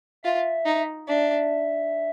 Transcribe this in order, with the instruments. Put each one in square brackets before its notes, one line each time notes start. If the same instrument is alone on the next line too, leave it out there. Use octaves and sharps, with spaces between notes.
[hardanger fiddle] F4 [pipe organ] E5
[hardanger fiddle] D#4
[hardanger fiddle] D4 [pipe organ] E5